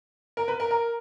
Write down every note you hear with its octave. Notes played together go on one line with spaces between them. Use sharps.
A#4
B4
A#4
A#4